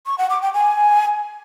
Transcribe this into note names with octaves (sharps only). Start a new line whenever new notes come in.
C#6
F#5
D6
G5
G#5